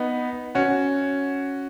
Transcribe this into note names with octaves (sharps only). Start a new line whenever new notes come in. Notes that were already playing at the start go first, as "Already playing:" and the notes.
Already playing: B3 D#4
C#4 F#4